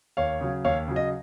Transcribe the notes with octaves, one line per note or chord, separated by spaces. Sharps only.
D#2 C#5 F5
C#3 F#3
D#2 C#5 F5
C#3 F#3
D#5